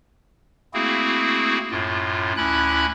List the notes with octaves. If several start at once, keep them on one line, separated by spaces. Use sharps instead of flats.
A3 A#3 C4 E4 F#4 G#4
F#2 A2 F4
D2 C#4 E4 B5 F#6